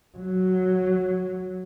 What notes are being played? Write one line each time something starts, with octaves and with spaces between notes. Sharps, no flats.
F#3